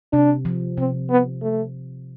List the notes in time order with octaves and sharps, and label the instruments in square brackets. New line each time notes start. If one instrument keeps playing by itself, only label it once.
[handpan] C3 [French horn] D4
[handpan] F3
[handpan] C3 [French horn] C4
[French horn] B3
A3